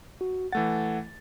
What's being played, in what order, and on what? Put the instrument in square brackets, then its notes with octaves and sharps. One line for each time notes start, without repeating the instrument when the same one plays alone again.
[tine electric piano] F#4
[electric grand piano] E3 A3 A6 [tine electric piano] F#5